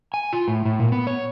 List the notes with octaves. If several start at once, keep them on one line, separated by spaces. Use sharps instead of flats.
G#5
F4
A2
A2
A#2
B3
C#5